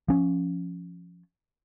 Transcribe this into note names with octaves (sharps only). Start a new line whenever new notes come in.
F3 C#4